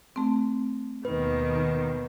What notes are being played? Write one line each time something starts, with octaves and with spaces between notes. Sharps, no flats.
A3 C4
D#2 B2 D#3 B4